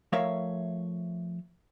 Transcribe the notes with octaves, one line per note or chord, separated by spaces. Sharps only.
F3 A3 A#4 C#5 E5 F5